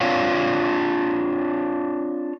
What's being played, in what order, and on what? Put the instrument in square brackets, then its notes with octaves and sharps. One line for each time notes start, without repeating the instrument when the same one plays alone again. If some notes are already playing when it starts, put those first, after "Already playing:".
[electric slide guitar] C4 D4 F4 C#5 F5